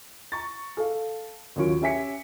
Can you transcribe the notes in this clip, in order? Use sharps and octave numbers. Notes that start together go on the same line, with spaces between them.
A#5 C#6 A6
A4 F5
D#2 F#3 C#4 F4 C#6 D7
C#4 G4 E5 G#5 B6 C#7